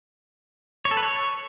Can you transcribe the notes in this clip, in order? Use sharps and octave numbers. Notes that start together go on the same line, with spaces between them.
C#5
A4
B4
C#5